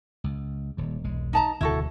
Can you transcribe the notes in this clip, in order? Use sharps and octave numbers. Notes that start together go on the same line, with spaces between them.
C#2
D#1 D#2
E1 B1 G#3
D#4 A5 A#5
E1 D2 C#3 E4 F#4 A4